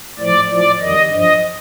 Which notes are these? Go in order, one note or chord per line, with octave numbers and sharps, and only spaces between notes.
A2 F3 D5
A2 F3 D5
F2 D#3 G3 D#5
G2 F3 D#5